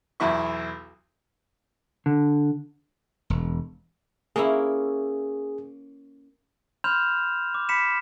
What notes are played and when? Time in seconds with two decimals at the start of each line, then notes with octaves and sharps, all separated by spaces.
0.20 B1 E2 E4 E5 C#6
2.06 D3
3.30 E1
4.36 A#3 C#4 E4 G#4
6.84 B5 C6 F6 G6 E7 F7
7.55 D6
7.69 B5 B6 C#7 E7